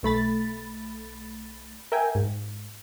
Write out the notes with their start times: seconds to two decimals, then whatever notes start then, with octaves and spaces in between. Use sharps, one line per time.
0.03 B1 A3 B5 A6
1.92 A#4 E5 G5 G#5
2.15 G#2